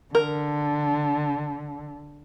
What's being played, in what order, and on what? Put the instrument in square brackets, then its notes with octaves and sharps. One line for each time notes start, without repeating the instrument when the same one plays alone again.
[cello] D3 [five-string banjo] A#4